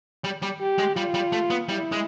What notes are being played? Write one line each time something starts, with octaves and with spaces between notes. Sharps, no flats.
G3
G3
G4
G#3
G3 F4
G3
A3
B3
G3 E4
G#3